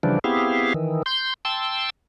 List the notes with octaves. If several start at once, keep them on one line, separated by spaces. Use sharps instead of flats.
C#3 E3 F3 G3 D4
B3 C4 E4 G4 G#4 F5
D#3 E3
C6 G6
G5 A5 C6 E6